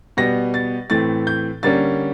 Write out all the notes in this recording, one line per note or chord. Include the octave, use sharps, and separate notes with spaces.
B2 G3 B3 A#6
A6
A2 E3 A3 C4 A6
G6
D3 G3 A#3 C#4 A6